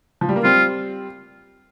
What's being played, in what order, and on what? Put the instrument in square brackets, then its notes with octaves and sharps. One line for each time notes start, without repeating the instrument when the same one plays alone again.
[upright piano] F3
G3
A#3
[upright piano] G3 C4 [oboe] F4